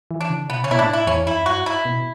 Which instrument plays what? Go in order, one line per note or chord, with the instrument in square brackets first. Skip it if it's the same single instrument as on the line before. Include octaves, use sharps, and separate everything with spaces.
[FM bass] E3
[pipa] D4
[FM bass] C#3
[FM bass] B2 [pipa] B3
[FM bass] C#3 [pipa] C#4
[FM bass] B2 [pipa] E4
[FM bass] A2 [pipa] D4
[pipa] E4
[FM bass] E2 [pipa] C#4
[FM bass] F#2 [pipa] E4
[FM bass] G2 [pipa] F#4
[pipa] E4
[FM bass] B2